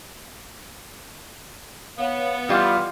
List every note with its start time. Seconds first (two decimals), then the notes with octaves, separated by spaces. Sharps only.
1.98 B3 C#5 F5
2.49 E3 G3 F4 C6 F6